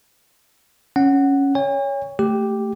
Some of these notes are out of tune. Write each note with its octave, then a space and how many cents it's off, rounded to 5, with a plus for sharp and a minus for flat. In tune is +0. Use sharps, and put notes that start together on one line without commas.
C#4 +0 F#5 +5
C#5 +10 G#5 -45
A3 +10 G4 +0